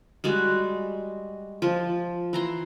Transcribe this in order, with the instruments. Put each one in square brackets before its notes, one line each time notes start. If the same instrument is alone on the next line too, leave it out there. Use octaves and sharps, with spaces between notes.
[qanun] G3 G#3 F#4
F3
E3 A#5 C6